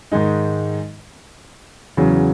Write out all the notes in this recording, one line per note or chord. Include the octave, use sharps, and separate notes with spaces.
G#2 D#3 G#3 D#4
E2 C#3 F#3